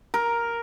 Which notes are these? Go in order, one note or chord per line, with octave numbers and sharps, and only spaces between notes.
A#4